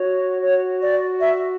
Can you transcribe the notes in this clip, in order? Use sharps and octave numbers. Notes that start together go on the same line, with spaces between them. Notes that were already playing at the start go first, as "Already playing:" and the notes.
Already playing: F#4 C#5
C#5
D5
E5